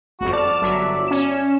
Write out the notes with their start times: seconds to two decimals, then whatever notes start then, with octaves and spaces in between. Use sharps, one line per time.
0.21 G1 F2 F#4
0.33 D5 A5 F6
0.62 G1 F#3 E5
1.08 C#4 E7